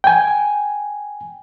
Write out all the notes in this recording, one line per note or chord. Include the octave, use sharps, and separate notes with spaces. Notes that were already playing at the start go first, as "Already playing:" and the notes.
G5 G#5